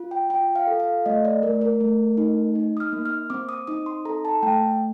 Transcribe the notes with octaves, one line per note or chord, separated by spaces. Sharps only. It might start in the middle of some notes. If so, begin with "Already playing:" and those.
Already playing: F4
G5
F4 G5
F5
A4
F5
A3 D#5
D5
A3 A#4
A#4
A3
D#4
D#4
D#6
F6
A#3
F6
C4 D6
D#6
D#4 D#6
C6
A4 A#5
A5
A3 G5